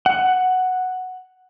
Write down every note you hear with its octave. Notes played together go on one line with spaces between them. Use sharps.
F#5